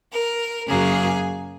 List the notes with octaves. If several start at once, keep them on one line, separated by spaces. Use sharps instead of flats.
A#4
F#2 C#3 F#3 A#3 G#4